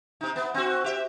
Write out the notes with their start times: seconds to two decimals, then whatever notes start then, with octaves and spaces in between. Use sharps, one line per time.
0.21 C3 D#4
0.36 B3
0.54 C4 F#4
0.84 G4 E5